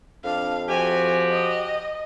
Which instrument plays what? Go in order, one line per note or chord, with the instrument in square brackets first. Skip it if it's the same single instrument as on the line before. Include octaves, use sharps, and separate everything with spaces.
[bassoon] F2 [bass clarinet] D4 [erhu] F5
[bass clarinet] F3 [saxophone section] F#4 G4 [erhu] G#5
[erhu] D#5